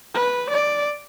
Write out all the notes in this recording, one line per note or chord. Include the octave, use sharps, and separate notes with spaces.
B4
D5